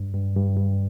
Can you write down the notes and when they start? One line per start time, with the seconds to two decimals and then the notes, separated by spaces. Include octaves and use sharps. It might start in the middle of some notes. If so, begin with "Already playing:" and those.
Already playing: G2
0.13 G2
0.36 G2
0.57 G2